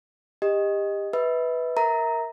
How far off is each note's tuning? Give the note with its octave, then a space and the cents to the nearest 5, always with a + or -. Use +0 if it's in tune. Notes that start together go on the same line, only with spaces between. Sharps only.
G4 +25 D#5 +0
B4 +0 E5 -35
A#4 +0 E5 -25 A#5 -5